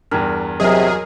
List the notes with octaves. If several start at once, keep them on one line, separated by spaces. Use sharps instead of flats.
E2 G2 A#4
C3 F#3 G#4 A#4 D#5